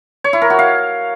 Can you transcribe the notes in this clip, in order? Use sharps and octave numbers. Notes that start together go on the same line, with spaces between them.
C#5
E4
A#4
F#4
F5